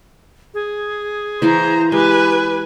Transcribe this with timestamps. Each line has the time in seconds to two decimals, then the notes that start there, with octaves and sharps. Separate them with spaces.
0.54 G#4
1.42 E3 E4 C5 F5 A#5
1.92 G#3 G4 B4 G#5